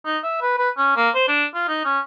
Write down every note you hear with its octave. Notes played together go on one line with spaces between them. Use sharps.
D#4
E5
B4
B4
C#4
A#3
C5
D4
F4
D#4
C#4